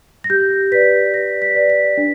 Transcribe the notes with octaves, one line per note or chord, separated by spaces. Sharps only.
A#6
G4 G6
B4 D5 B6
G4 A#6
B6
B4 D5
B6
D4